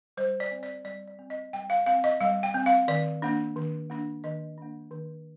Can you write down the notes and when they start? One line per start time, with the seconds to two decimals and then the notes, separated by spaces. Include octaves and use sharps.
0.17 G3 C5
0.40 D5
0.51 C4
0.63 D5
0.85 G3 D5
1.08 D5
1.19 C4
1.30 D#5
1.53 G3 G5
1.70 F5
1.86 C4 F5
2.04 D#5
2.21 G3 F5
2.43 G5
2.54 C4
2.66 F5
2.88 D#3 D5
3.22 A#3 D4
3.56 D#3
3.90 A#3 D4
4.24 D#3 D#5
4.58 A#3 D4
4.91 D#3